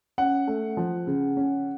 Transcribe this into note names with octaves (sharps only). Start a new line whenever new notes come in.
C#4 F#5
A3
F3
C#3
C#4